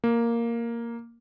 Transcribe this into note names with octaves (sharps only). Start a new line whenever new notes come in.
A#3